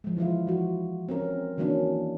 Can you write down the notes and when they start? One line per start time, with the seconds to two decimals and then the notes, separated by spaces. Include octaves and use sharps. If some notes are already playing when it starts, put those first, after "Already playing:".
0.04 F3 G#3
0.17 E3 F3 E4 F4
0.47 F3 F#4
1.09 C4 C#4 A#4
1.57 D#3 E3 F#3 A#3 C#4 D4